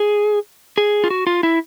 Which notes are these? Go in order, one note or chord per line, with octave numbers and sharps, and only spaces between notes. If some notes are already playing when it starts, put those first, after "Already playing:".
Already playing: G#4
G#4
F4
F#4
F4
E4